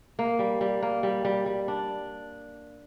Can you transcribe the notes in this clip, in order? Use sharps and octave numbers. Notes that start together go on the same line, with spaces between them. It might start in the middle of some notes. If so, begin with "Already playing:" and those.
A#3
G3
G3
A#3
G3
G3
G3
D4